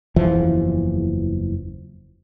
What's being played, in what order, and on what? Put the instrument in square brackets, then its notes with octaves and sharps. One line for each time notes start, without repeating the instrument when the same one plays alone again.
[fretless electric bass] F#1 E2 E3 F3